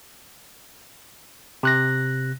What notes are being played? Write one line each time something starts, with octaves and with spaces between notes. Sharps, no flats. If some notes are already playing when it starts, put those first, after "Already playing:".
C3 F#6 A#6